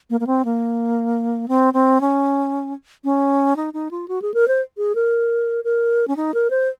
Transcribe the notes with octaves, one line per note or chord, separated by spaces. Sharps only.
A#3
A#3
C4
A#3
C4
C4
C#4
C#4
D#4
D#4
F4
F#4
G#4
A#4
C5
G#4
A#4
A#4
C#4
D#4
A#4
C5